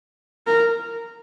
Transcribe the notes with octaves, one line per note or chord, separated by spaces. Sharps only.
A#4